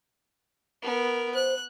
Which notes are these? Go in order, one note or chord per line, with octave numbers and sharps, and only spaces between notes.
B3 A#4
C5 F#6